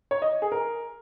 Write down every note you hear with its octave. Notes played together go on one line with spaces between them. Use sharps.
C#5
D#5
G#4
A#4